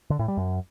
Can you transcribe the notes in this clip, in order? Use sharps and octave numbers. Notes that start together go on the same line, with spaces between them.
D3
A2
G3
F#2